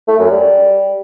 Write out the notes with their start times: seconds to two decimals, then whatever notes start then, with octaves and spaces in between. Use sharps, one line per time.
0.08 A3
0.19 F#2
0.31 G3